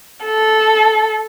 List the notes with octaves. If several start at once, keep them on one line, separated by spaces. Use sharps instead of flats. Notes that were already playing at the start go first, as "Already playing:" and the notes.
A4